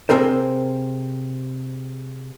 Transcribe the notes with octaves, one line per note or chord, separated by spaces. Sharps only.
C3 B3 C4 G#4 A#4 C5